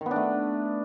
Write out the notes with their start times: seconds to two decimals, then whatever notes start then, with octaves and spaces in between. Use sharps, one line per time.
0.01 D#3
0.06 B3
0.11 D4
0.16 A3